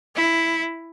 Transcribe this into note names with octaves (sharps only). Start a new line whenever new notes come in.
E4